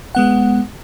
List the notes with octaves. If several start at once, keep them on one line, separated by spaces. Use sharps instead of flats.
G#3 B3 F#5